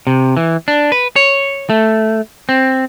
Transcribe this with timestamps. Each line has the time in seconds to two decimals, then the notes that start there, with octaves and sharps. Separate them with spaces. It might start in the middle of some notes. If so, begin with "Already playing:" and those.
0.07 C3
0.37 E3
0.68 D4
0.92 B4
1.16 C#5
1.70 A3
2.49 C4